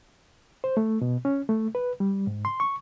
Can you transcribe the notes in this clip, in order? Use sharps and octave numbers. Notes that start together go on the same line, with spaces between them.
C5
A3
B2
C#4
A3
B4
G3
G#2
C6
C#6